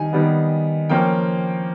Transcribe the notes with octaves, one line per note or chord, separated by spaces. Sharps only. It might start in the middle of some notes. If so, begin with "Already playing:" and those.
Already playing: D#3 G3 G#5
D#3 G3 B3
F3 A#3 C#4 G5